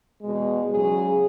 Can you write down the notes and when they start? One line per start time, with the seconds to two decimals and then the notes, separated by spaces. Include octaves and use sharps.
0.22 E2 B2 G#3
0.71 E2 C#3 F#3 G#4